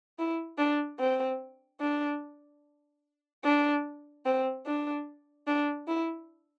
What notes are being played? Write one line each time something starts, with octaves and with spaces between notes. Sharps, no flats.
E4
D4
C4
D4
D4
C4
D4
D4
E4